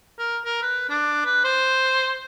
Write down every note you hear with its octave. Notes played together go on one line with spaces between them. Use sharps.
A#4
A#4
B4
D4
B4
C5